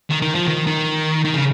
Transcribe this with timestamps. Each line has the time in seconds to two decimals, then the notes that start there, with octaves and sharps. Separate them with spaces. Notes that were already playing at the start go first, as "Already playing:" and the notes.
0.10 D#3
0.22 D#3
0.35 F3
0.47 D#3
0.67 D#3
1.25 D#3
1.34 C#3